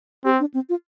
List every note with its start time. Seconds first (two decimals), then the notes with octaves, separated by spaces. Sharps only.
0.25 C4 G4
0.40 D4
0.54 C4
0.69 F4